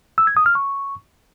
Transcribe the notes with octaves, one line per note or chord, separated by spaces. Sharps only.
E6
G#6
D#6
F6
C#6